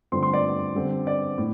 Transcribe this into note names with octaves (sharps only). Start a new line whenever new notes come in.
G2 D3 F3 A3 C4 C6
C6
D5
D3 G3 C4
D5
A2